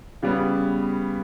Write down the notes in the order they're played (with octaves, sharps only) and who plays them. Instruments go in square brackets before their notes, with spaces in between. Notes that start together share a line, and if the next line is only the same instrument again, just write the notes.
[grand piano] C#3 G3 B3